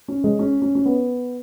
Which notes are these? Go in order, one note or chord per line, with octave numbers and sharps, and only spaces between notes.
C#4
G#3
C#4
C#4
C#4
B3